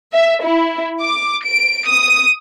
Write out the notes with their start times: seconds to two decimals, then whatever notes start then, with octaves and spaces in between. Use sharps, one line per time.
0.13 E5
0.43 E4
1.02 D6
1.45 D7
1.87 D#6